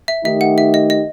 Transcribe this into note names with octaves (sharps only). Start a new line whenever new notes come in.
E5
D#3 A3 D#4 G4 E5
F#5
E5
D#5
D#5